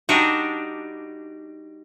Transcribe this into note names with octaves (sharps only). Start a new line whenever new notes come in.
G3 D4 D#4 F#4